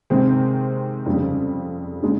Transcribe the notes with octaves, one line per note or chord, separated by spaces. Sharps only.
C3 D#3 G#3 C4
F2 C#3 G3
C#3 G#3 D#4